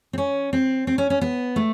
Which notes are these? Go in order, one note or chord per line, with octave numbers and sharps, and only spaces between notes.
C4
C#4
C4
C4
C#4
C#4
B3
A3